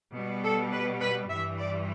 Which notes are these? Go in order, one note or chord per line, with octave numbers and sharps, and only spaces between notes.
B2 G3
A4
B4
B4
G2 E3 G3 E5
D5